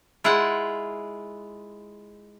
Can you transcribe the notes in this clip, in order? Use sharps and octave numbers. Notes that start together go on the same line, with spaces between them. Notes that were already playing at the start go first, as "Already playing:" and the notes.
G#3 E4 F4 G#4 F#5